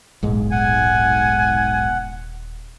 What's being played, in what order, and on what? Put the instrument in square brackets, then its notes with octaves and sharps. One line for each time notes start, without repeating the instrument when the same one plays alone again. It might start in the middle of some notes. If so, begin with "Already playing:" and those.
[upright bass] D#1 [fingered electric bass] B1 G#2 G#3
[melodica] F#5 [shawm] G#5